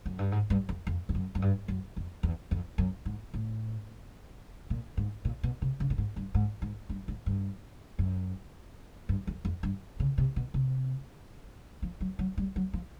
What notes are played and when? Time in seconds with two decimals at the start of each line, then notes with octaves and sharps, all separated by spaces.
0.06 F#2
0.19 G2
0.32 G#2
0.50 G2
0.69 F2
0.87 F2
1.09 F2
1.15 F#2
1.35 F#2
1.42 G2
1.68 F#2
1.96 F2
2.23 E2
2.51 F2
2.78 F#2
3.05 G#2
3.34 A2
4.70 A#2
4.97 G#2
5.25 A#2
5.43 B2
5.62 C3
5.80 C#3
5.90 A2
5.98 G#2
6.16 G2
6.34 G#2
6.62 G#2
6.89 G2
7.08 G#2
7.26 G2
7.99 F#2
9.09 G2
9.27 F2
9.45 F2
9.63 G2
10.00 C#3
10.18 C3
10.36 B2
10.54 C3
11.82 F3
12.01 F#3
12.19 F#3
12.38 G3
12.56 F#3
12.73 F3